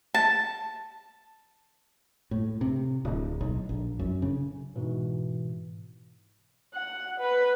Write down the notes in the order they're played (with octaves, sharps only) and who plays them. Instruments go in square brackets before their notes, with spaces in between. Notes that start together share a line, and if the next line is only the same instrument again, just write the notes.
[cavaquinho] A5
[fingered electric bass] A2
C3
D1
B1
A#1
F#2
C#3
[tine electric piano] G#2 B2 E3
[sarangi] F#5
B4